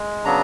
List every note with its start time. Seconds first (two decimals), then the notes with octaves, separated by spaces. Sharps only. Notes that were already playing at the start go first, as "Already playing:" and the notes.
Already playing: G#3
0.25 C#3 F#3 B3 D4 A#5